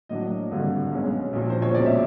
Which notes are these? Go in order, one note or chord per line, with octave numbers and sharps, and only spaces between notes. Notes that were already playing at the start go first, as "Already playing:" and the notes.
A2 F#3 A#3 D4 D#5
G#1 G2 D3
B1 B2 G#3 C#4
A#1 A#2 F3
C5
C#5
C#2 B2 G#3 D5
E5